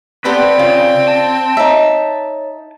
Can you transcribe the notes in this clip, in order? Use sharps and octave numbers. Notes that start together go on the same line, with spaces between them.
C4 G4 A4 B4 C5 D5 F#5
C#3 F4
A5
D#4 C#5 E5